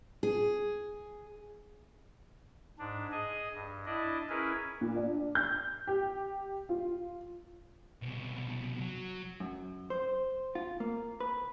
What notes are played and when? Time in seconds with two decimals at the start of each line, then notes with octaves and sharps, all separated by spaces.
0.23 G#4
2.79 G#2 D4
3.12 G#4 D#5 G#5
3.53 G2
3.86 D4 E4 D5 D#5
4.29 C#4 E4 G#4 A#4 B4
4.81 A#2
4.96 D4
5.35 G6
5.87 G4
6.69 F4
8.02 C2 B2
8.80 F#3
9.40 F#2
9.90 C5
10.55 F4
10.80 A#3
11.20 B4